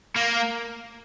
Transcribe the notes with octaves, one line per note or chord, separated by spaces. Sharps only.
A#3